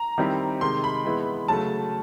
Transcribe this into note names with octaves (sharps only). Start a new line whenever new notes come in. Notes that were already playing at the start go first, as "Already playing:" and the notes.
Already playing: A#5
D#3 G3 C4 E4 G4
C3 D#3 G#3 C6
B5
E3 G#3 B3 E4
C#3 F#3 A3 A5